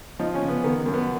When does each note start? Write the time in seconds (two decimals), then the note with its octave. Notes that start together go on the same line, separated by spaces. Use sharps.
0.19 F3 D#4
0.34 C#4
0.41 C#3
0.48 B3
0.64 D#3 B3
0.86 F#2
0.93 B3